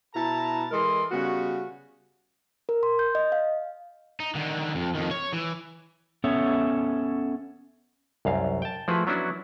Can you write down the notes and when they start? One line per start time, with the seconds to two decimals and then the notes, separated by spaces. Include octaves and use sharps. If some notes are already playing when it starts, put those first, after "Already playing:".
0.15 B2 E4 A5 A#5
0.72 E3 G#3 A4 A#4 D#5 C6
1.12 C#3 G3 B3 F#4
2.69 A#4
2.83 C6
2.99 G6
3.15 D#5
3.32 F5
4.20 D#4
4.35 D3 D#3
4.75 F2
4.95 F2 D#3
5.11 C#5
5.33 E3
6.24 B3 C#4 A4 C#5 E5
8.25 C2 F#2 F5
8.62 G5 A5
8.88 F3 A3 E4 F#4 G#4 B4
9.07 F#3 B3 C#4 D4 E4 F#4